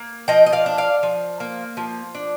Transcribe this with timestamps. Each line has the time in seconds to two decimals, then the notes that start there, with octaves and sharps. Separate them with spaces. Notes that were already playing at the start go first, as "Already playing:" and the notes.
Already playing: A#3
0.28 F3 D#5 G5
0.46 D#5
0.52 D5 F5
0.66 D4
0.78 D5 F5
1.03 F3
1.40 A#3
1.77 F3
2.15 D4